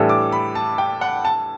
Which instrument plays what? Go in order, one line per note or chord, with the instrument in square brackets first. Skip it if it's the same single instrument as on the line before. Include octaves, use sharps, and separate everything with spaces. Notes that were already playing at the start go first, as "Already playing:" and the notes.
Already playing: [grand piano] A2 E3 G3 D4 A4
[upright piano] D6
B5
A5
G5
F#5
A5